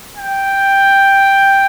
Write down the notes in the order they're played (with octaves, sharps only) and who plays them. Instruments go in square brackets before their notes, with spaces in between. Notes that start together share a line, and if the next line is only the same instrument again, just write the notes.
[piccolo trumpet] G5